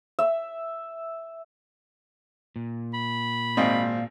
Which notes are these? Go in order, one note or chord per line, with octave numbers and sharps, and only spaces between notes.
E5
A#2
B5
G#1 A#3 C4 D5 D#5 F5